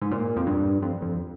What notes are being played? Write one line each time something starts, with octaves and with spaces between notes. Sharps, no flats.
G#2
A#2
F2
G2
F2
F2